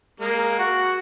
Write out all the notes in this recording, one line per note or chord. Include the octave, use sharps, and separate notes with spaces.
G#3 A#3
F#4